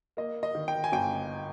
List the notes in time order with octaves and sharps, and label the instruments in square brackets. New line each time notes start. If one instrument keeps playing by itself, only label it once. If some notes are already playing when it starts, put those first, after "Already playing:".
[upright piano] A#3 D#5
D#5
D#3
G5
G#5
G1 G5